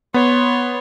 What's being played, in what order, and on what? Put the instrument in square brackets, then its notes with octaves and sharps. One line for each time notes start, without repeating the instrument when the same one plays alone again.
[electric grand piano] B3 [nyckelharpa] C#5 C6